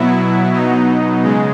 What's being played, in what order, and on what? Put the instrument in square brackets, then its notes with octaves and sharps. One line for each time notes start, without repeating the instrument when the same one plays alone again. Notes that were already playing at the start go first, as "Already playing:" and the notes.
Already playing: [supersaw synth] B2 F#3 B3 E4
B2 F#3 B3 D#4
C#3 G#3